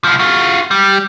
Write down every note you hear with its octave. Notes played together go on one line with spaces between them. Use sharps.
C2 F3
F4 F#4
G3